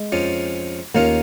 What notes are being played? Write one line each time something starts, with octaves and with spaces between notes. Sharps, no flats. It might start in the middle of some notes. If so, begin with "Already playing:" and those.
Already playing: G#3
F2 F3 C#4
D#2 D#3 A#3 C#4 F4